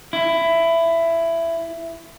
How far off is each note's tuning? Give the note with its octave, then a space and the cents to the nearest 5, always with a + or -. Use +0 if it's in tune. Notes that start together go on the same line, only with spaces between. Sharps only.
E4 +15